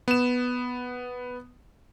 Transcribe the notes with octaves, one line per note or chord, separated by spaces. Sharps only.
B3 E7